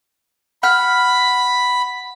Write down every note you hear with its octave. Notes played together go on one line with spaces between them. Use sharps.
F#5 B5 F6